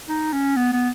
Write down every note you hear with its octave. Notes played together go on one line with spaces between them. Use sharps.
D#4
C#4
B3
B3